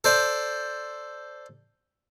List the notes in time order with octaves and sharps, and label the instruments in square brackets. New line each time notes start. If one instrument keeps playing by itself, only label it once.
[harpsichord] A4 C5 D5